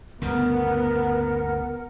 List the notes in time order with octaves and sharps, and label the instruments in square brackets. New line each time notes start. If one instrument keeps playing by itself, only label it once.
[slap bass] D2 G2 C#3 [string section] B3 [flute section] A#4 F#5